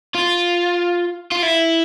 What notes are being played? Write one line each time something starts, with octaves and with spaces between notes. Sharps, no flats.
F4
F4
E4